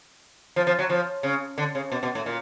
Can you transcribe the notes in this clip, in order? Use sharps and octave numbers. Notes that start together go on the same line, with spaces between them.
F3
F3
F#3
F3
C#3
D3
C#3
B2
B2
A2
A#2